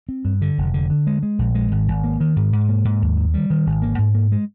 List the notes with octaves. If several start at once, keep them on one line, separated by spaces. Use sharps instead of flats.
C4
G2
D3
F1
D3
D3
G#3
G#3
A#1
G#3
G#1
G#1
A#3
D#3
G#2
G#2
A#3
G#2
D#2
D#3
G3
D#3
G#1
A#3
G#2
A#3
G#3